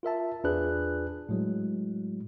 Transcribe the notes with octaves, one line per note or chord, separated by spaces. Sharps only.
F4 A#4 E5 A5
E2 D4 F4 G#4 B4 F#6
A2 F#3 G#3